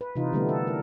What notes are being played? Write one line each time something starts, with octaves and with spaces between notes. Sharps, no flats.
B4
C3 E3 D#4 F4
D3 E3 G3 A3 B3
A4
A#4